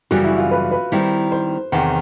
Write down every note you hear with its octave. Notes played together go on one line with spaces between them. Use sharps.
F#2 C#3 E3 G3 F#4
E4
F4
B4
B4
D#3 G3 C4 E4
C5
E2 C3 D#3 F#5